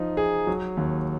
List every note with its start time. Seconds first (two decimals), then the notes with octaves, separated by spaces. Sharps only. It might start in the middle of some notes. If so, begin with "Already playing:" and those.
Already playing: F3 D#4
0.17 G#4
0.47 F#3
0.77 D#2